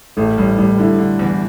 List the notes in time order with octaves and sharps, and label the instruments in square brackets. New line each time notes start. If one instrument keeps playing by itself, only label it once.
[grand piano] A1 [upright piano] A3
[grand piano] A1 [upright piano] G3
[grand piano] A1 [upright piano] G3
[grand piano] D3 [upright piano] E4
[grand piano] D3
E2